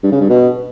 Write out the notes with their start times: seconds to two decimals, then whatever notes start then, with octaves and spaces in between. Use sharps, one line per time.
0.03 G2
0.12 C#3
0.21 G2
0.29 B2